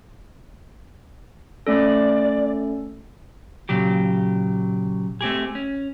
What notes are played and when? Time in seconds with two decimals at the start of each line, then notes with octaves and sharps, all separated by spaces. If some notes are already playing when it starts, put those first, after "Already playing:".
1.67 A3 C#4 A4 D5
3.69 A#2 C#3 F#3 G4
5.21 A3 C4 G4 G#4
5.55 C#4